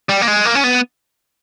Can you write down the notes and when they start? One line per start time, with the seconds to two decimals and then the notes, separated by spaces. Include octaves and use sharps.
0.09 G3
0.21 A#3
0.27 G#3
0.45 A#3
0.55 C#4
0.64 B3